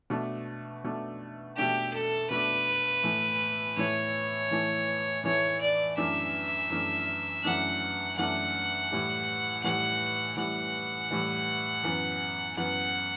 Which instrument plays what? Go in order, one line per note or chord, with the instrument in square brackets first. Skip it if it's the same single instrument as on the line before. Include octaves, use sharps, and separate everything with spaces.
[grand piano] B2 A3 D4
B2 A3 D4
[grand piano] B2 A3 D4 [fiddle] G4
[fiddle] A4
[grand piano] B2 A3 D4 [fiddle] B4
[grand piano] A2 E3 A3
[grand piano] A2 E3 A3 [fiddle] C#5
[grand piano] A2 E3 A3
[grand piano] A2 E3 A3 [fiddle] C#5
[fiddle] D5
[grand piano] F#2 E3 A3 D4 [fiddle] E5
[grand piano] F#2 E3 A3 D4
[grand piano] F#2 E3 A3 D4 [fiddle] F#5
[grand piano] F#2 E3 A3 D4 [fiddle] F#5
[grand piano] A2 E3 G3
[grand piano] A2 E3 G3 [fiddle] F#5
[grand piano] A2 E3 G3 [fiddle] F#5
[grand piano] A2 E3 G3
F#2 E3 B3
[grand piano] F#2 E3 B3 [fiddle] F#5